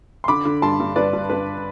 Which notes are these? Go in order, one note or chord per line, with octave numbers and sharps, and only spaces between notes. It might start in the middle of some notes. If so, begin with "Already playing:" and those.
C6
D3 B5 D6
D3
G2 A5 C6
G2
G2 B4 D5
G2
G2 B4